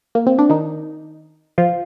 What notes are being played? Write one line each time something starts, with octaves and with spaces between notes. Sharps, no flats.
A#3
C4
D4
D#3 D#4
F3 F4